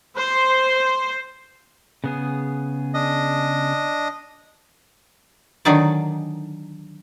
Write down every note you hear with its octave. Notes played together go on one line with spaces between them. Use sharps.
C5
C#3 B3 G#4
D4 D#5
D3 D#3 F#3 D#4 G#4 D5